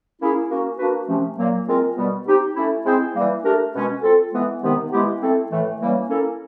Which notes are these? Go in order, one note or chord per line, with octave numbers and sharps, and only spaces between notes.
A#3 C#4 E4 G#4
A#3 C#4 F#4
A#3 D4 F#4 B4
C3 F3 A3 C#4
A#2 F#3 A#3
G#3 C4 F4 A#4
B2 G3 B3
C4 D#4 G4
A3 C#4 E4
G#3 C4 E4 G#4 C5
E3 G3 A#3
A3 D4 G4 A#4
B2 G#3 C#4
C4 F4 A4
E3 G#3 B3
C3 D#3 G#3 B3 D#4
E3 G#3 B3 E4 G4
A3 C4 E4 A4
A2 E3 A3
E3 G3 A#3 C#4
A#3 C#4 E4 A4